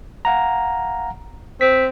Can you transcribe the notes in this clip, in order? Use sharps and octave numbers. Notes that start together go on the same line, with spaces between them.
F5 F#5 A#5
C4 B6